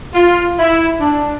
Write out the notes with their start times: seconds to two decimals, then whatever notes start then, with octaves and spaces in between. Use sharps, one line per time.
0.15 F4
0.59 E4
1.01 D4